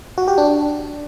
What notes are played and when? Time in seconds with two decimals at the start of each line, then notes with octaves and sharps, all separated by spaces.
0.18 F#4
0.28 G4
0.38 D4